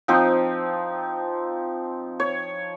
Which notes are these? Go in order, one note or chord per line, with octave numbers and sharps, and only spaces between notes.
F3 C4 D#4
C#5